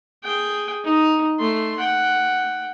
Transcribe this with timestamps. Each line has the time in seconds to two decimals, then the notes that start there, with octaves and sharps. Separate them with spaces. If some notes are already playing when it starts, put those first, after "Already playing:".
0.24 G#4 G5
0.84 D#4
1.40 A3 C6
1.79 F#5 G5